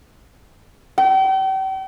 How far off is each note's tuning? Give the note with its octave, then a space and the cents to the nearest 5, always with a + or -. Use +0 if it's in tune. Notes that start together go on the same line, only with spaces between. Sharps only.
G5 -40